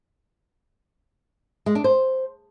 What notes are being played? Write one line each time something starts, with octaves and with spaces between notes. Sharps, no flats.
G#3
D4
C5